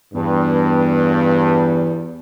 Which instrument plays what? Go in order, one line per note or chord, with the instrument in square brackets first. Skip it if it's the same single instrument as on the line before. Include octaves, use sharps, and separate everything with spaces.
[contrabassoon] E2 [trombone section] G2